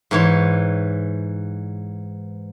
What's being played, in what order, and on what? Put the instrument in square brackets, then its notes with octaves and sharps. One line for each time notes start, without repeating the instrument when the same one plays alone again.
[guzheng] G#2 E3 C#5